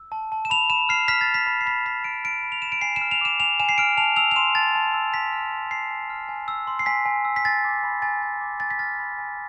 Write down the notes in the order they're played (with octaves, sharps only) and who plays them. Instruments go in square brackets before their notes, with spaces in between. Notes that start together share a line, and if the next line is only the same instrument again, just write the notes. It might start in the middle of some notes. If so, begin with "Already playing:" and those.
Already playing: [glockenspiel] E6
A5
A5
E7
B5 F7
B5 E7
F6 C7
F6 B6
A6
B5
B6
B5
C7
B5 B6
B5 B6
F6 D7
F6 D7
B5
F7
B5 E7
D7
G#5 C7
E7
F6
F7
D6 E7
G#5 F7
G#5 E7
C7
F6 D7
A5 F7
E6 F7
F7
C6 E7
A5 A6
A5
E6
G#5 B6
F6
C6
G#5 C7
G#5
F6
G#5
E6
C6
C7
G#5 B6
G#5
E6
B6
G#5 A6
D6
B5
G#5 A6
G#5
D6
G#5 A6
B6
F6 A6
B5
G#5